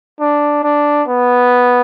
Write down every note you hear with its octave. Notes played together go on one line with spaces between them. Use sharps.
D4
D4
B3